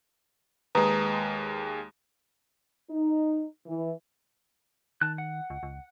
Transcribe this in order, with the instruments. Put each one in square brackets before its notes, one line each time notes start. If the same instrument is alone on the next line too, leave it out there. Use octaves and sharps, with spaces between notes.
[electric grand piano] D#2 G#3 [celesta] B4 A#5 D#6
[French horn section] D#4
E3
[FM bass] D#3 [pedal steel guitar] A5 F#6
[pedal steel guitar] F#5
[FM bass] C#2
C#2